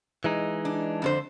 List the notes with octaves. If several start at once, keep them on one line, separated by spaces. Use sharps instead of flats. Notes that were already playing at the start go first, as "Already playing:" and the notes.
E3 G#3 D#4
D4
F2 D3 C5